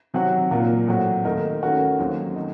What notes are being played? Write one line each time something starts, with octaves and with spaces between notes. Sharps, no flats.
C3 D#3 F#3 C4 F#4
A#2 F#3 A#3 F4 A#4
A2 F#3 C4 F#4
D#2 D#3 A3 D#4 A#4
D#3 A3 C#4 F#4 A#4
D#2 D#3 F#3 C4
D#3 A3 D#4